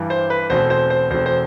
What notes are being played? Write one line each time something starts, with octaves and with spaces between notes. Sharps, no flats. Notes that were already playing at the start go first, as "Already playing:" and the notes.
Already playing: G2 E3 G3
C5
B4
E2 B2 A3 C4 C5
C5
C5
E2 B2 A3 C4 C5
C5